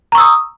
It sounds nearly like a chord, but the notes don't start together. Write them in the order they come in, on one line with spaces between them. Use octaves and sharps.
A#5 C#6 E6 D#6